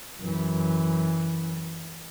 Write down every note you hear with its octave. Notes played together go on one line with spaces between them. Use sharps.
F#2 E3